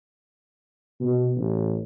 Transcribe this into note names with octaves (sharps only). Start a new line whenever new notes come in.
B2
A1